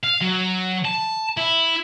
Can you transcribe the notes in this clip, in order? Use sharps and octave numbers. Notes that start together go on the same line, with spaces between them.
F5
F#3
A5
E4